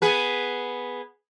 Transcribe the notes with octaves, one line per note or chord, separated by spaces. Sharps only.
B3 G#4 B4